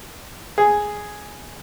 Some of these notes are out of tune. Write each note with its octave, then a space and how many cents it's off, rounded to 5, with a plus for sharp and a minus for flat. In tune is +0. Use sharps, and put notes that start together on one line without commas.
G#4 +0